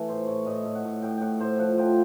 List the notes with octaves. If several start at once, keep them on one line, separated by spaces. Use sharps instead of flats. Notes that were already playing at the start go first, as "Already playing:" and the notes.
Already playing: E3 A3 A4
A2 C5
A2 C#5
A2 D#5
A2
F#5
A2
A2 G5
A2 F#5 G5
A2 C5
F3 F#5
F3 G5